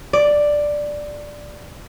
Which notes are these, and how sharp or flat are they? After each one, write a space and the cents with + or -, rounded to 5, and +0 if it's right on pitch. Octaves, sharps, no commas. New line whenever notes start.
D5 +5